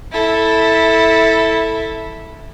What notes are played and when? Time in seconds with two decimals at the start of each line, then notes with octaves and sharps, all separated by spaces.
0.12 E4 A4